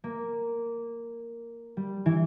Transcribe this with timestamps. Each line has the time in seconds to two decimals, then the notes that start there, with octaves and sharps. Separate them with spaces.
0.04 A#3
1.77 G3
2.06 E3